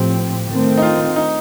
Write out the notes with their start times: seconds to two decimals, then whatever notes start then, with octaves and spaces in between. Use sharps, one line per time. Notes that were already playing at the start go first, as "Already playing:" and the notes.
Already playing: A2 F3 C4 G4
0.48 D#3 A3 C4
0.78 D#4
0.82 F4
1.16 D#4